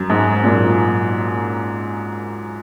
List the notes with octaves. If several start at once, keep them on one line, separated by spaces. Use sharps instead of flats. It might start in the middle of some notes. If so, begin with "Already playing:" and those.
Already playing: F#2
G#2
F#2 A#2